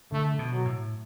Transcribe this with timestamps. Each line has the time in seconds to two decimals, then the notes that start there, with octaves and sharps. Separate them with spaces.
0.12 D3 A3
0.39 B2
0.52 F#3
0.65 A2